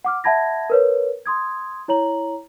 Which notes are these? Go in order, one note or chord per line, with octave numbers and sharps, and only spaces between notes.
F#5 D6 F6
E5 F#5 A5 B5 G#6 A#6
A#4 B4 C#5
C6 D#6 G#6
E4 C#5 A#5 F#7